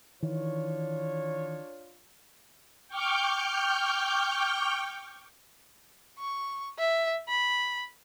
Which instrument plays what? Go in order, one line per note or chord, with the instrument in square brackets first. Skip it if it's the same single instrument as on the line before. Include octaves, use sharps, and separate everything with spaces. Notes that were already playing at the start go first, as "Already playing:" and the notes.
[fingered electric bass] D#3 E3 [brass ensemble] D4 F4 C#5
[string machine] G5 C#6 D6 F6 G6
[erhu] C#6
E5
B5